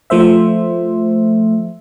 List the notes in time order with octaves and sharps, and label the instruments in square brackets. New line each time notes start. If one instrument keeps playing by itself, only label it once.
[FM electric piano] F3 A3 C5 E5